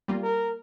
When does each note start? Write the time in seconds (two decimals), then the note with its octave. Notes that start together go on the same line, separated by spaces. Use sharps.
0.08 G3 A#3 F4
0.23 A#4